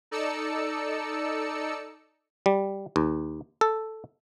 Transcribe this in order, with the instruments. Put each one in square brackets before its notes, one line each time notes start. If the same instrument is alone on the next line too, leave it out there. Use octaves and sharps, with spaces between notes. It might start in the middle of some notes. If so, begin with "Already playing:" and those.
[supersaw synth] D#4 A4 D5 E6 C#7
[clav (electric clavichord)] G3
D#2
A4